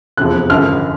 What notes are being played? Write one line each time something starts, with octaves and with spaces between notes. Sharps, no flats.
F1 E2 C3 F3 F#6
G#1 F#2 D3 F3 F6